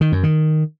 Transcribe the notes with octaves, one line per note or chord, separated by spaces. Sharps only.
D#3
F#2
D#3